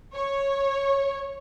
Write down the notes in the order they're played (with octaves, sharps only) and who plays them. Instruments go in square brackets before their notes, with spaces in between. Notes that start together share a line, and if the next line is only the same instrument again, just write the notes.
[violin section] C#5